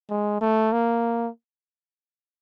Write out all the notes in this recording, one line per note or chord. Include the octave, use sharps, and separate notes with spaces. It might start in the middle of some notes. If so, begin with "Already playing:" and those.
G#3
A3
A#3